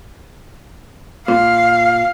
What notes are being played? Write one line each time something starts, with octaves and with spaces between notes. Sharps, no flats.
A#2 F5